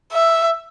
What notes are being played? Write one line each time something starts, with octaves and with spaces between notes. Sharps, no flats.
E5